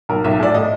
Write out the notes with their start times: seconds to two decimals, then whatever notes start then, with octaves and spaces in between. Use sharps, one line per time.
0.09 B1 A#4
0.24 B1 E5
0.40 A2 D5
0.54 A2 D#5